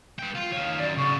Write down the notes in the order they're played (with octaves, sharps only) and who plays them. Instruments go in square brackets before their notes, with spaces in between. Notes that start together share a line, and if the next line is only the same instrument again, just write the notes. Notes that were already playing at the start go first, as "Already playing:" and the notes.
[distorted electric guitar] B4 G5
F4
[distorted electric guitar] D#3 C#5 [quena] F5
[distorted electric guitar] F#2 [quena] D5
[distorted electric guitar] C#3 B3 [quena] C#6